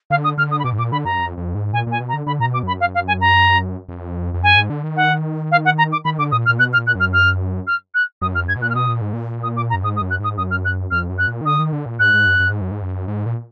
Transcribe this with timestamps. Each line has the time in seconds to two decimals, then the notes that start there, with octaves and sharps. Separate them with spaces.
0.10 D3 F5
0.24 D#6
0.38 D3 F6
0.51 D#6
0.59 B5
0.64 B2 D6
0.73 G#2
0.78 A#2 D6
0.92 D3 B5
1.05 F#2 A#5
1.19 F2
1.37 F2
1.55 G#2
1.73 A#2 G#5
1.87 A#2 G#5
2.00 B2
2.09 A#5
2.13 D3
2.26 D3 B5
2.40 A#2 A#5
2.45 B2
2.54 D6
2.63 F#2 B5
2.80 F5
2.95 F5
3.08 G#5
3.21 A#5
3.89 F2
4.34 F2
4.43 F#2 G#5
4.56 G#2
4.70 D3
4.83 D#3
4.96 F#5
5.51 F5
5.65 F#5
5.78 A#5
5.92 D6
6.05 D#3 B5
6.19 D3 D6
6.32 A#2 D#6
6.46 F6
6.49 A#2
6.59 B2 F#6
6.73 F6
6.77 A#2
6.87 F#6
6.95 F#2 F6
7.13 F6
7.67 F6
7.94 F#6
8.22 F#2 D#6
8.35 F2 F6
8.48 F#2 G#6
8.56 B2
8.62 A#2 F#6
8.70 F6
8.75 B2 D#6
8.89 A#2
9.01 G#2
9.13 A#2
9.43 D#6
9.56 D6
9.70 A#5
9.74 F#2
9.83 G#2 D#6
9.96 D#6
10.01 F#2
10.10 F#6
10.20 G#2 D#6
10.38 F#2 D#6
10.51 F6
10.65 F#6
10.91 F2 F6
11.09 F#2
11.18 F#6
11.27 A#2
11.41 D#3
11.46 D3 D#6
11.59 D#3
11.73 D3
11.86 A#2
11.99 G#2 F#6
12.14 G#2
12.27 F#2
12.40 F#2
12.50 G#2
12.61 F#2
12.71 G#2
12.82 F#2
13.08 G#2
13.26 A#2